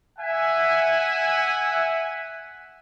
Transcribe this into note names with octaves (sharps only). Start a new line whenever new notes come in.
E5 F#5 G#5